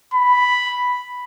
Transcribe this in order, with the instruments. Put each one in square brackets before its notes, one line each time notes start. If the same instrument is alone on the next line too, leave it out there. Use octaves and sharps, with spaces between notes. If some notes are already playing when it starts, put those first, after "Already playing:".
[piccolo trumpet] B5